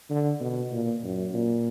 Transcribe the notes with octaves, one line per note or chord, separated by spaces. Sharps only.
D3
B2
A#2
F#2
A#2